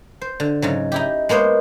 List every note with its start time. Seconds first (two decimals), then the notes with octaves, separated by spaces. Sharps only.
0.22 C5
0.40 D3
0.62 G#2 C#3 F#3
0.92 D#4 E4 G4
1.29 G#3 A#3 B3 C5 C#5